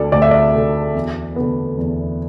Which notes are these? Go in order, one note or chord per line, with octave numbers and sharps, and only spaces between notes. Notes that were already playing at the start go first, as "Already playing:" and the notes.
Already playing: D2 D3 A3 A4 D5
D2 D5
E5
D5
D3 A3
E2
D3 B3
E2